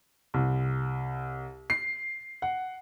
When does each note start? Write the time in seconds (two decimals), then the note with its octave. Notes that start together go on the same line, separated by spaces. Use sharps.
0.34 C2
1.70 C7
2.42 F#5